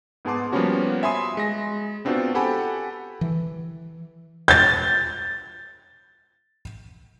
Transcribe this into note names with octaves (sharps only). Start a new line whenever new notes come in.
G#2 B3 G#4 A5 C6 D6
F3 G3 A#3 B3 C#4 F#4
E5 G#5 B5 C6 D#6
G#3 A#6
B3 C4 D4 F4 F#4 C5
G4 A4 F#5 G#5 B5
E3
G6 A6